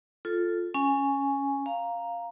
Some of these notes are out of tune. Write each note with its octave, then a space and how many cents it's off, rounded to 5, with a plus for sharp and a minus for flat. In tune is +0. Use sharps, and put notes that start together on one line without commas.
F4 +0 A4 +0
C#4 +0 G#5 +0
F5 +0 A#5 +0